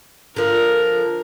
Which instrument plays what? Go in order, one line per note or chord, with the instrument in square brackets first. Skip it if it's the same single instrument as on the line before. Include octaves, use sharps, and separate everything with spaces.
[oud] D3 F3 [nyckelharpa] A#4